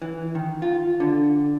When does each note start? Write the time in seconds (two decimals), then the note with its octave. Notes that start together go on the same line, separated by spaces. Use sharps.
0.02 E3
0.35 D#3
0.62 F4
1.00 D3